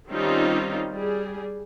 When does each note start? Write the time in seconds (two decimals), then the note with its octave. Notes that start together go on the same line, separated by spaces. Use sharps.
0.10 D#3 G3 C4 C#4 D#4 F4
0.93 G3 G#4